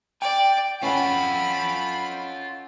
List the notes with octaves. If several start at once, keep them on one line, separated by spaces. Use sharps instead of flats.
D5 G5
C#4 F4 A4 F#5 B5